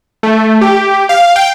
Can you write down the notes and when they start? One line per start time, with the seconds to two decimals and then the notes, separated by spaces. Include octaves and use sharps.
0.23 A3
0.61 G4
1.09 F5
1.36 G5